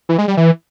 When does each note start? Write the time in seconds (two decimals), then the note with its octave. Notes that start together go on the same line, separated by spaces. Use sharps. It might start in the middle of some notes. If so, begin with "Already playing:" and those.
0.09 E3
0.18 G#3
0.28 G3
0.37 E3